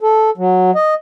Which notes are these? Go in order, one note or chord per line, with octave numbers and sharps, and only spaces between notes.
A4
F#3
D#5